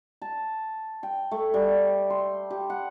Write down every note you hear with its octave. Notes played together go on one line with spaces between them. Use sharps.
A5
G5
A3
G3
C6
G4
F#5